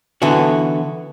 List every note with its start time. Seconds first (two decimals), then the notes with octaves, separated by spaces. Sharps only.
0.22 D3 E3 B3 F#4